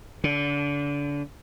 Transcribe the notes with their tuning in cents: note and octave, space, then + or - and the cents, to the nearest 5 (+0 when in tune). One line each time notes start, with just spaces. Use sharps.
D3 -30